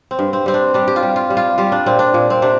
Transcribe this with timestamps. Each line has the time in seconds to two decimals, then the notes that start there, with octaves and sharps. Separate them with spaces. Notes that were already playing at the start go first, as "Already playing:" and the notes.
0.11 C4
0.19 G2
0.33 C4
0.46 G3 C4
0.54 D4
0.74 G3 D4
0.88 G4
0.96 F4
1.03 G3
1.16 F4
1.30 G3
1.37 F4
1.58 G3 F4
1.72 D4
1.86 A#2 C4
1.99 D4
2.14 A#2
2.30 C4
2.42 C3 D4